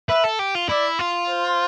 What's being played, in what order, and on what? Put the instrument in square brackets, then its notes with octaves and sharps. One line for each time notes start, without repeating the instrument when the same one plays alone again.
[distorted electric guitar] B4 [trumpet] E5
[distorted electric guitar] A4
G4
F4
[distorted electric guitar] E4 [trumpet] D5
[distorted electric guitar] F4
[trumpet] C5